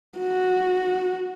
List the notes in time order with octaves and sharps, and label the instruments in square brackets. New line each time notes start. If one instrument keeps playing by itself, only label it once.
[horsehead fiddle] F#4